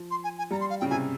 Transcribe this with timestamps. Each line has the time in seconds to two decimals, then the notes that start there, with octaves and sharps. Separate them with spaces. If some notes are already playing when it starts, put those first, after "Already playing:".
Already playing: F3
0.11 C6
0.24 G#5
0.38 G#5
0.51 G3 A#5
0.61 C6
0.70 F5
0.80 C#3 G5
0.90 C3 G#5